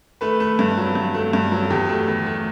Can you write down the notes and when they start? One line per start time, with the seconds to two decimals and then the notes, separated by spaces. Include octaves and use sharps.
0.21 A3 B4
0.40 A3
0.59 G2
0.77 F#3
0.95 G2
1.14 A3
1.33 G2
1.52 F#3
1.70 E2 G4
1.89 A3
2.08 E2
2.26 A3